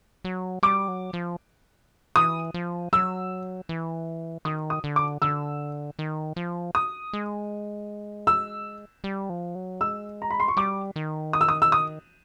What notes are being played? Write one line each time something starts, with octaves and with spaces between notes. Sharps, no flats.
F#3
G3 D6
F#3
F3
E3 D#6
F3
F#3 E6
E3
D#3 D#6
D#6
D3
D6
D3 E6
D#3
F3
D#6
G#3
E6
G3
F3
F#3
G#3 E6
A#5
B5
C6
C#6
G3 D6
D#3
D#6
E6
D#6
E6
D#6